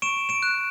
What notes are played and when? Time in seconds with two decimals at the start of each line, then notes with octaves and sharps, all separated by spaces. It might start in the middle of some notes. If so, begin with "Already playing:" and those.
0.02 C#6 D7 E7
0.29 D7 E7
0.43 F#6